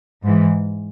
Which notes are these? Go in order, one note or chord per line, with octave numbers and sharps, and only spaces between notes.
G#2 E3